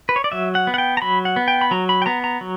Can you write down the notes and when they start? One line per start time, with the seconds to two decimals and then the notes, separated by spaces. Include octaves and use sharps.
0.09 B4
0.16 C#5
0.24 D5
0.32 F#3 E5
0.55 F#5
0.67 B3
0.74 F#5
0.78 G5
0.97 A#5
1.02 F#3 B5
1.25 F#5
1.36 B3
1.48 G5
1.61 B5
1.71 F#3 A#5
1.89 B5
2.02 G5
2.06 B3 A#5
2.24 A#5
2.41 F#3